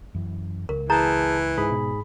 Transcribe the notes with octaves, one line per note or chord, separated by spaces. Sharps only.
F#2 E3
C#2 A#4
E3 G#4 A5 A#5 G6
G#2 G#4 B5
B2